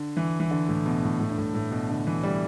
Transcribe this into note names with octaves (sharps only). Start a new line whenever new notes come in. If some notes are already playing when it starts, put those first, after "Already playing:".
Already playing: D3
E3
E3
D3
A2
B2
A2
A2
G2
A2
A2
B2
D3
E3
G3